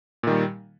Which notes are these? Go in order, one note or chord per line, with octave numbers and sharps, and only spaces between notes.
A#2 D#3 G3